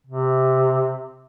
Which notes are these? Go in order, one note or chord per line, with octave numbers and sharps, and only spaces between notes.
C3